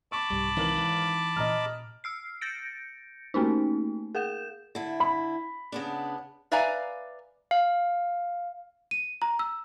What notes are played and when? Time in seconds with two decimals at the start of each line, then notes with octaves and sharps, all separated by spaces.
0.12 A5 B5 C#6 D6
0.30 C2 G#2 G3
0.57 G#1 E3 A#4 F#7
0.76 E3 C4
1.36 A#2 C#4 D#5 A#5 F6
2.04 E6 F6 C7
2.41 G6 A6 A#6 C#7 D7
3.34 A3 A#3 C#4 D#4
4.15 G#4 A#4 F#5 G6 E7
4.75 D3 E4
5.00 B5
5.72 C#3 B3 D4
6.51 B4 D5 E5 F5 G#5 A#5
7.51 F5
8.91 D#7
9.22 A#5
9.39 E6